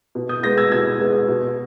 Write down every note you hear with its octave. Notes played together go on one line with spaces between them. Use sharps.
B2
D#6 G6
G#3 B3 G6 A#6
E6 G#6
B2 E6 G#6
G#3 B3
B2